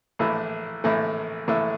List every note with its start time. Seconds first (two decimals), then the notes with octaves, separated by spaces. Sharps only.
0.19 A#1 A2 E3 A3 E4
0.84 A#1 A2 E3 A3 E4
1.48 A#1 A2 E3 A3 E4